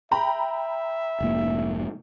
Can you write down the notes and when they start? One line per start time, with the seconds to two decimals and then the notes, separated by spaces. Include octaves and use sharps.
0.11 E5 G5 A#5 B5
1.21 F1 G#2 A#3